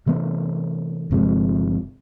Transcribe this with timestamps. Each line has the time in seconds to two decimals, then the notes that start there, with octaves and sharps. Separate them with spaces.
0.06 C3 E3 A3 B3
1.11 G1 C3 F3 G#3